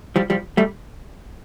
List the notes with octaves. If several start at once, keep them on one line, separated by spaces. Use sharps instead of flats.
F3 G3
F3 G3
G3 A3